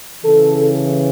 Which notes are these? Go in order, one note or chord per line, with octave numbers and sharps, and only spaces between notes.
C#3 E3 A4